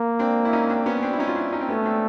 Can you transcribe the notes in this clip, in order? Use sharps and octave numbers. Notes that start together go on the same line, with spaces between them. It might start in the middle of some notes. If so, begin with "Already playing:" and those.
Already playing: A#3
C4 D4
E4
C#4 D#4
C4 D4
B3 C#4
C#4
C4 D4
E4
C#4 D#4
F4
D4 E4
C#4 D#4
C4
A3 B3 C#4
C4 D4